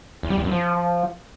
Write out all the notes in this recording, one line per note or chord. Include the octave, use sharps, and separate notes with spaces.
E2
G3
E2
F#2
F3